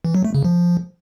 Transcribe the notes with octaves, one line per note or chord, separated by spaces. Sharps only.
E3
F#3
A3
C#3
F3